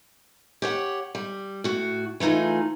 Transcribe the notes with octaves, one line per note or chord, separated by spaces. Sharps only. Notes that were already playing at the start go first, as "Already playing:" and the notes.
G4 C#5 F#5
G3
A2 F#4
E3 A3 D#4 F4 G#4